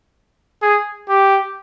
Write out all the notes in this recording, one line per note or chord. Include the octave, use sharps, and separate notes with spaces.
G#4
G4